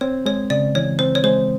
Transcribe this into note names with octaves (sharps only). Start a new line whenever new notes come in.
C4 C#5
G#3 C#5
C#3 D5
E3 C#5
C4 C5
C#5
G#3 C5